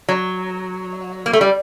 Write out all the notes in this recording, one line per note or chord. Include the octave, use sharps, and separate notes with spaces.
F#3
A#3
A3
G3